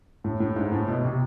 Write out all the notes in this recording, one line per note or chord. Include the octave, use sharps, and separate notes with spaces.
A2
A2
G#2
A2
B2
C3